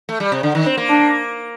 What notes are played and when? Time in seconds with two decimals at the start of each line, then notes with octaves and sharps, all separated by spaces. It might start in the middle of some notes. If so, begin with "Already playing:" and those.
0.09 A3
0.20 G3
0.32 C3
0.43 D3
0.55 D#3
0.66 C4
0.77 A#3
0.89 D4